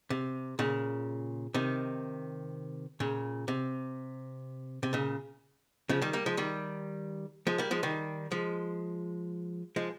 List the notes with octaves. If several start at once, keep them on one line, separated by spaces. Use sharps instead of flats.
C3
A#2 C#3
C3 D#3
A#2 C#3
C3
C3
A#2 C#3
C#3 F3
D#3 G3
G3 A#3
F3 G#3
D#3 G3
F3 G#3
G3 A#3
F3 G#3
D#3 G3
F3 G#3
F3 G#3